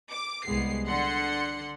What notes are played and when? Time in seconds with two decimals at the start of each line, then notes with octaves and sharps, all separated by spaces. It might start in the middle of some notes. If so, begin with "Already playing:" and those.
0.11 D6
0.46 C2 G#3 B3 C7
0.87 D3 F#5 C6 C#7